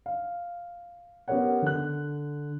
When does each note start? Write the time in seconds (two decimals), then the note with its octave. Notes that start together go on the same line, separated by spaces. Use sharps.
0.06 F5
1.28 B3 C#4 G4 A#4 C#5 F#5
1.62 D3 F#6